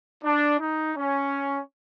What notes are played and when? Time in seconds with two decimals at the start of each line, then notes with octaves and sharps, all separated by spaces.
0.24 D4
0.60 D#4
0.96 C#4